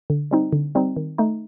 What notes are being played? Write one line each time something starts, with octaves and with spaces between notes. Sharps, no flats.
D3
G3 C4 D#4
D3
G3 C4 D#4
D#3
A3 D#4